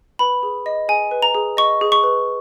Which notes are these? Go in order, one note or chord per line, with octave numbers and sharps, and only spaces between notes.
B4 B5
G#4
D#5
G#4 G#5
B4
A#5
G#4
D#5 C#6
G#4
C#6
B4